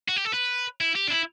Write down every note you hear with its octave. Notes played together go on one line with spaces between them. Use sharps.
F#4
G4
A4
B4
E4
G4
D4
E4